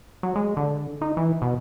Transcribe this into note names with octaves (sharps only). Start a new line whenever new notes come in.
F#3
G#3
D3
D#4
E3
B2